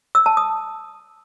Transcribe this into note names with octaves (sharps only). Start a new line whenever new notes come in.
E6
A5
D#6